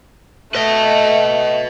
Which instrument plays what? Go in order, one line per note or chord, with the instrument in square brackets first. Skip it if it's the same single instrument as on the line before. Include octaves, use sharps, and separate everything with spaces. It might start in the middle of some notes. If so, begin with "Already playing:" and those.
[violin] A3 [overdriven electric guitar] B4 D#5